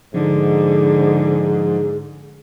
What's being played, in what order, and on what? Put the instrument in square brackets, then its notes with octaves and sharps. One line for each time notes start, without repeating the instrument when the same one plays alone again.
[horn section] G#2 [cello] D3 [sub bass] F3 [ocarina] G#4